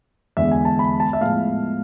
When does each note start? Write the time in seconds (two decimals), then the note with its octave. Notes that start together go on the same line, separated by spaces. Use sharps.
0.37 E2 D3 G#3 B3 E5
0.51 G#5
0.65 A5
0.79 B5
1.00 A5
1.13 E5
1.21 A2 F3 G#3 B3 F5